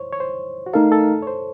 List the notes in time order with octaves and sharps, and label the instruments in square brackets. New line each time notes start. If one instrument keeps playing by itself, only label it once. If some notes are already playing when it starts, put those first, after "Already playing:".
Already playing: [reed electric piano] C5 C#5
C#5
C5
F#4
[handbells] A3 D#4 A#4 F5 [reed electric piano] A4
[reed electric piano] A4
C#5
C5